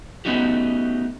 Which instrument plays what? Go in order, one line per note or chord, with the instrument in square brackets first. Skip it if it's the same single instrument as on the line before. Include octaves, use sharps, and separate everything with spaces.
[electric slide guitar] A3 B3 C#4 D#4 F#4 G4